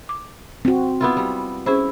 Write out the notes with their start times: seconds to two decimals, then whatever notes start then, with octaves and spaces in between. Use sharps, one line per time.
0.09 D6
0.65 C4 F#4
1.01 B3 E4 F4
1.17 G3
1.66 C#4 E4 G#4 C5